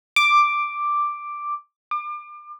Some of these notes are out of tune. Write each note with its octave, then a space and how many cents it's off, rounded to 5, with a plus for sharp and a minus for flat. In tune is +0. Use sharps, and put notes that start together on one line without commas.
D6 +5
D6 +35